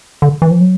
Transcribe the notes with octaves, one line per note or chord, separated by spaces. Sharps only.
D3
E3
F3
F#3